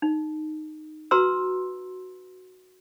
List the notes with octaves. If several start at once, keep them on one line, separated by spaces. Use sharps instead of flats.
D#4
F#4 B4 A#5 C6 E6